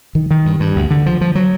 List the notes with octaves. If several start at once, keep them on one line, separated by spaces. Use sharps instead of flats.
D#3
D#3
G2
G2
D2
D3
F3
F3
F#3